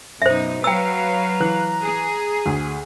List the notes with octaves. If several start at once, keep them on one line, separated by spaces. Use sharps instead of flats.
F#2 B2 D#4 C5 E5
F#3 B4 F5 G5 A#5 E6
E3 F#6
G#4
D2